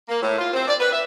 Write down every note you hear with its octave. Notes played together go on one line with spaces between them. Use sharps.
A#3
A2
F4
C4
D5
B4
E5